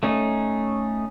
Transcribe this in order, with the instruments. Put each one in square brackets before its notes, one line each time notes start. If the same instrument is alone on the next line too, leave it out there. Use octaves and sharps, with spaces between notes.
[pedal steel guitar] A3 C#4 D#4